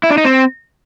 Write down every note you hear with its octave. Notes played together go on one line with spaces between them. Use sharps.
E4
D4
D#4
C4